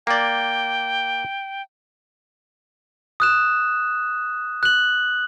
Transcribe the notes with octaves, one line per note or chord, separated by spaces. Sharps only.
A#3 D5 G5
D#6 F#6 E7
F#6 F#7